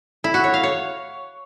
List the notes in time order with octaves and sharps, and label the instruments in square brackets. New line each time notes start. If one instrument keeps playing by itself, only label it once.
[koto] E4
F#4
C#5
F5
C#5